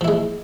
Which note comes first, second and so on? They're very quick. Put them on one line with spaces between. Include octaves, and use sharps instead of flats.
F3 E4 G#3